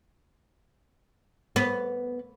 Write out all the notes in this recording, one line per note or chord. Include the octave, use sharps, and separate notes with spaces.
B3